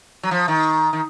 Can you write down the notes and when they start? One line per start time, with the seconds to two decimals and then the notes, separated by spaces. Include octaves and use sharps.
0.23 F#3
0.31 F3
0.48 D#3
0.93 D#3